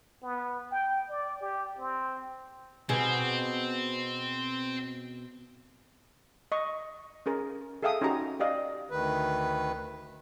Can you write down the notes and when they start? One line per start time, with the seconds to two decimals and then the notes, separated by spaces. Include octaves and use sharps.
0.23 B3
0.71 G5
1.09 D5
1.41 G4
1.79 C4
2.89 B2 C4 G#4
6.52 D#5 C#6
7.26 C#4 G#4 A#4
7.82 G#4 A4 E5 F5 G5 D#6
8.01 C#4 D#4 F#4 G4 A#5
8.40 G4 D5 D#5 F5
8.90 D2 D#3 B4